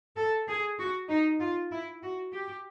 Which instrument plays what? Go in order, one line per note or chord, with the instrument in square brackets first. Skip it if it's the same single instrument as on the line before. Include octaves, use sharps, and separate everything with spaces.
[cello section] A4
G#4
F#4
D#4
F4
E4
F#4
G4